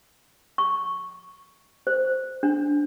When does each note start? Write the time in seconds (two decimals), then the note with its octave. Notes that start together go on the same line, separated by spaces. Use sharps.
0.58 C#6
1.87 C5
2.43 D4